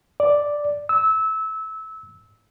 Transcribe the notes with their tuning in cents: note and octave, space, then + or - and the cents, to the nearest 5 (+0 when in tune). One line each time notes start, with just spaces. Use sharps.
D5 +0
E6 -20